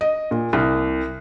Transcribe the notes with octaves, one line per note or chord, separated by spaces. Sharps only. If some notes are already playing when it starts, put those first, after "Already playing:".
D#5
A#2
C2